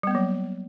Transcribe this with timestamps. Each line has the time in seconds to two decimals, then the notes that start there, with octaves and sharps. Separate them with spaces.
0.03 G3
0.07 B3
0.11 A#3
0.15 F#3